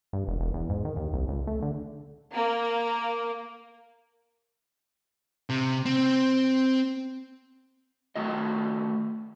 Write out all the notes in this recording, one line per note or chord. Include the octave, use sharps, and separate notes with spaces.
G2
E1
E1
E2
G#2
D#3
D#2
C2
C#2
A3
D3
A#3
C3
C4
D#3 A3 F#4 D#5